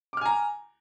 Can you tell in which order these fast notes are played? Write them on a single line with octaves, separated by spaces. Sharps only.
D6 F6 G#5 A#5